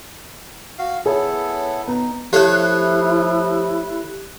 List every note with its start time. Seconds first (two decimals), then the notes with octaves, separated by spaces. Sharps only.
0.78 F#4 F5
1.06 B3 E4 G#4 A4 C#5
1.88 B3 D#4
2.33 F3 A3 E4 G4 C#5 F#6